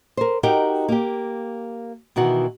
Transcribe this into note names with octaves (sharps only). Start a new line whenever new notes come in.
A#4 C5
D#4 F#4 G4 A#4 D#5 G5
A#3 G4
B2 D#3 E3 F#4